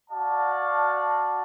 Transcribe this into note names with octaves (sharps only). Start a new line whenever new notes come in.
F#4 D5 F5 A5